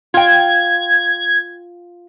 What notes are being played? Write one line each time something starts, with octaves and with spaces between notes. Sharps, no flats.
F4 G5 G#6